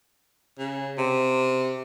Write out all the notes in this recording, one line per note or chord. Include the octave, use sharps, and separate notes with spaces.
C#3
C3